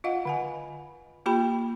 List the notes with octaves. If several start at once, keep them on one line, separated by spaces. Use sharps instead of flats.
F4 D#5 F5 F#5
D3 F#5 G#5
A#3 F4 G4 G5 B5